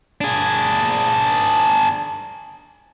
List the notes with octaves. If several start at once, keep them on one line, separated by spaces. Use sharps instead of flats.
D4 G#4